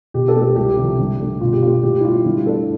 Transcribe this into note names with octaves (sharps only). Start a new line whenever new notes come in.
B2 G4
A4
A3 D4 G4
A4
C2 G4
C3 F3
G2
D3 A3
B2 F4
G4
A3 D4 F4
F4
A2 G4
E4
G3 D4 F4
G2 E4
D3 A3 D4 A4